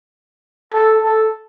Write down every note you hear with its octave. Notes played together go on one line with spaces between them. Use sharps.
A4
A4